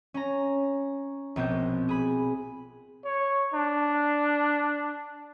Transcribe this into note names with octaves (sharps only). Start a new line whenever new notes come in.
C#4 A#5
A#1 B2 B3 C4 G6
G#4 B5
C#5
D4